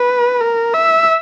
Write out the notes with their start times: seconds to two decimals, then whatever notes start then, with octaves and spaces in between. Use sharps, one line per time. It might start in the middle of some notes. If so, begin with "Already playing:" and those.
Already playing: B4
0.41 A#4
0.74 E5